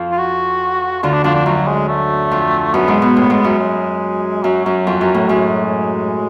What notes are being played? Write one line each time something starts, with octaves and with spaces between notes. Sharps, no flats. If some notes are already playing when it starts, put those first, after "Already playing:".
Already playing: F2 F3
F4
F#4
D2 D3 F4
D4
F2 F3 D4
D4
F#2 F#3
G#3
A3
F2
F#2 B3
G#2
B2
A2
G#2
F#2
G#3
F#2 F#3
F#2
F2
F#2
A2
F#2 G#3